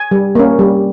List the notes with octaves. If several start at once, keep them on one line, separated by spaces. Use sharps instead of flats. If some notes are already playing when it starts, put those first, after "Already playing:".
Already playing: G#5
G3
A#3 C#4
G3